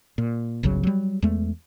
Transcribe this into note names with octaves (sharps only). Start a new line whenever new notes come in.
A#2
G1 C2 C#3 F#3
F#3 G3
E2 G#3 A3